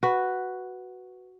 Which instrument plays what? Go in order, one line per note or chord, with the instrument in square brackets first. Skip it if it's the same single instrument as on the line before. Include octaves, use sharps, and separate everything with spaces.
[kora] F#4 B4